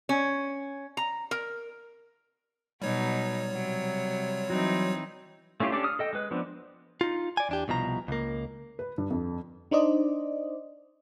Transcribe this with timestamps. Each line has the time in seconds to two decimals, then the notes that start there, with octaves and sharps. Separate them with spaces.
0.09 C#4
0.97 A#5
1.31 A#4
2.82 B2 F#3 G3 D#4 C#5
3.50 C3 F#3
4.50 E3 F#3 C4 D#4
5.60 A3 C#4 E4 F4 G4
5.72 C#4 D4 G4 A4 D5
5.84 D#6 F6
5.99 A4 D#5 G5
6.13 G#3 B4
6.31 F3 B3 C4 D4
7.01 D#4 F4
7.37 D5 G#5
7.49 E2 D4 G4
7.68 C2 B2 F3 A#5
8.08 C#2 A#3
8.79 B4
8.98 G2
9.10 F2
9.71 D4 D#4 C5 D5 D#5